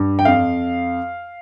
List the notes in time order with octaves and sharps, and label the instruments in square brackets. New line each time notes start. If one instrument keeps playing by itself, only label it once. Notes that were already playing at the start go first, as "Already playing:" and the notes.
Already playing: [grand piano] G2
G5
F2 F5